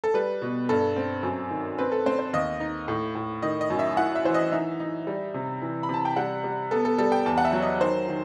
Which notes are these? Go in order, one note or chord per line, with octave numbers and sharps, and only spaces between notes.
A4
G3 B4
B2
G2 A4
C4
F#2
D#3
C4 B4
A4
C4 C5
C5
D#2 D#5
D#4
A2
A2
D#3 D#5
D#5
F#2
E5
E4 F#5
E5
E3 C5
D#5
D#4 E5
D#4
G3
C3
E3
B5
C3 A5
G5
G3 F#5
G3
B3 A4
A4
G3 A4
G5
E2 A5
F#5
E5
F#3
D#5
D#3 C5
D#3